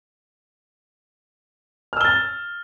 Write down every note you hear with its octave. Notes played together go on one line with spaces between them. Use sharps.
E6 F6 A6 G7